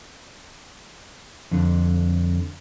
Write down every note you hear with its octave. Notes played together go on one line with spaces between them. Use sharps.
F2 D3